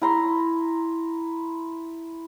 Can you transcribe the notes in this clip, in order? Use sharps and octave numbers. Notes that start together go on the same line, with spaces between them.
E4 A#5 C6